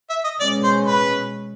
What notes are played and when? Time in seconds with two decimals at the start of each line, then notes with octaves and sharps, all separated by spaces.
0.10 E5
0.24 D#5
0.40 B2 G#3 C#4 D5
0.64 C5
0.87 B4